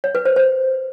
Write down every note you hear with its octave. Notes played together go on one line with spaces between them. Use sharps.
C#5
B4
C5
C5